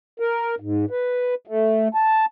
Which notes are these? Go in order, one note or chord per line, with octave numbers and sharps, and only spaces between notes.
A#4
G#2
B4
A3
A5